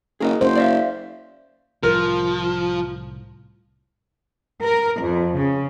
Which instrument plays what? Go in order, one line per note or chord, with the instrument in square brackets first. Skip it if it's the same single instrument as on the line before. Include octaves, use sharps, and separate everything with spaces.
[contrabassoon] F#1 [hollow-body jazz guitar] G#4 A#4 D#5
[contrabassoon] F#1 [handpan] C5
[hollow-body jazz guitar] D5 E5 F5
[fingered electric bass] C2 A2 [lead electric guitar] F3 [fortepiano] A#4
[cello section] A#4
F2
C#3